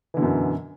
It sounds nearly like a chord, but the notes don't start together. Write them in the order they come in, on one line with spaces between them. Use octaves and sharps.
E3 D3 B2 F#2